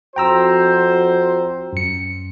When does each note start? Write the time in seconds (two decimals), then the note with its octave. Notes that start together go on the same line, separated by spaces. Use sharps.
0.16 F2 F#4 C5 G5 A#5 E6
1.73 F#2 C#7